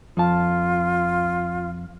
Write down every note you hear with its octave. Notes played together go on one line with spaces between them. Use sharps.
F2 F4 A5